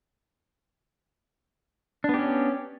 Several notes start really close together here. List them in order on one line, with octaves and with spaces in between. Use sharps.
D4 B3 G4 C#4